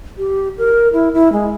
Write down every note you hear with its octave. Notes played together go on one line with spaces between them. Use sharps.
G4
A#4
E4
E4
G#3